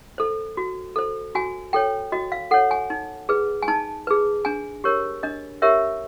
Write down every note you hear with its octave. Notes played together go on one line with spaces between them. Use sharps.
A4 C5
F#4
A4 C5
F#4 G#5
A4 C#5 G5
F#4 D#5
F5
A4 C#5 F#5
G#5
D#4
G#4 B4
G#5
D#4 A5
G#4 B4
D4 G#5
G4 A#4 C#5
D4 D#5
G4 A#4 C#5 E5